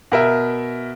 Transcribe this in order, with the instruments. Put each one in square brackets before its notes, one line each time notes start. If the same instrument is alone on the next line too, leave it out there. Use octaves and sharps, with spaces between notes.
[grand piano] B2 A#4 E5